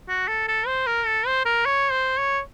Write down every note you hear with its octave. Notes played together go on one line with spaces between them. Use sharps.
F#4
A4
A4
C5
A#4
A4
C5
A#4
C#5
C5
C#5